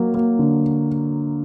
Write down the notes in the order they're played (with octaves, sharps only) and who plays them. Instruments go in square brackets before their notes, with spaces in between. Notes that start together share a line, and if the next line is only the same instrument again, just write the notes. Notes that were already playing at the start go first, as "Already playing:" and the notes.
Already playing: [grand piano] F#3 A#3
A#3
D3